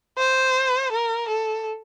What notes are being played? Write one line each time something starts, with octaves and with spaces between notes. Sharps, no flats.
C5
A#4
A4